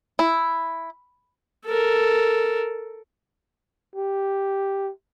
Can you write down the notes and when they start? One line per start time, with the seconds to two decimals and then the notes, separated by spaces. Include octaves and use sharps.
0.19 E4
1.66 A4 A#4
3.95 G4